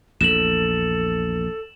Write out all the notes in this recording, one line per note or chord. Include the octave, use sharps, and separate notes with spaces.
A#1 E2 A4 E7 F#7